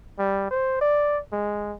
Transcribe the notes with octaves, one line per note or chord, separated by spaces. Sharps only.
G3
C5
D5
G#3